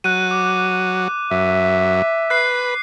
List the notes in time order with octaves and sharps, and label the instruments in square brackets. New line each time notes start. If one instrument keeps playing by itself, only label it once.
[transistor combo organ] F#3 [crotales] F#6 D#7
[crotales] D6
[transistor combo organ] F#2 [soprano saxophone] E5
[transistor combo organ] B4 [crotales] F#6 C7